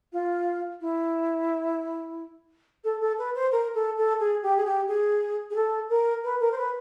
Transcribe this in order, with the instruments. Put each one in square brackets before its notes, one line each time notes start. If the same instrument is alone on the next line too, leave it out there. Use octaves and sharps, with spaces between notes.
[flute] F4
E4
A4
A4
B4
C5
A#4
A4
A4
G#4
G4
G#4
G4
G#4
G#4
A4
A#4
B4
A#4
C5
B4